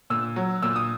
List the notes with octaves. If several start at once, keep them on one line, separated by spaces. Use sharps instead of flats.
A#2 E6
F#3
A#2 E6
D#6